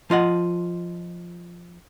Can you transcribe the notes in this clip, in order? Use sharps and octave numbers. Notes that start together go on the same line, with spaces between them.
F3 F4 D#5 F#5